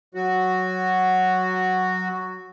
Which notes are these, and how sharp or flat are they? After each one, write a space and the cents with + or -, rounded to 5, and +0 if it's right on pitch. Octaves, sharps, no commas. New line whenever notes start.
F#3 +0 F#4 +0